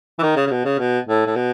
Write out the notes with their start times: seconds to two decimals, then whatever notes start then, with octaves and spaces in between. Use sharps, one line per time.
0.19 E3
0.22 D#3
0.36 C#3
0.46 C#3
0.51 B2
0.65 C#3
0.79 B2
1.07 A2
1.26 A2
1.35 B2